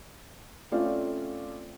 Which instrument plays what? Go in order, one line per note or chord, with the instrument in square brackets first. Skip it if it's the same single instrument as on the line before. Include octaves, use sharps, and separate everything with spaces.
[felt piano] A3 C4 C#4 F4 D5 F5